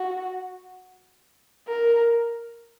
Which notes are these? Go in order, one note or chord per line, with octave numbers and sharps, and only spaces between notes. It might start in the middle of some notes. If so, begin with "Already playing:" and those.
Already playing: F#4
A#4